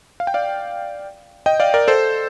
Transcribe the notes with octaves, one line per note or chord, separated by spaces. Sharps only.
F5
G5
D5 F5
D#5 G5
D5 F5
A#4 D5
A4 C5